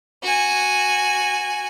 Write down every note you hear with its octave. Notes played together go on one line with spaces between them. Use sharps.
F#4 G#5